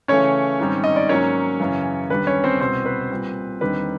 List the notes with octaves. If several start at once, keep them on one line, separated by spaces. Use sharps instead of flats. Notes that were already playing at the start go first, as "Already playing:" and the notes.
C#3 E3 A3 C#4 C#5
G#2 D#3 G3 C4
D#5
D5
G#2 D#3 F#3 A#3 C#4 C#5
F#2 C#3 E3
D#2 D3 G3 B4
C#4 C#5
C4 C5
C2 B2 G3 C4 C5
B4
A#2 G3 C4
D#2 D3 G3 C4 D#4 B4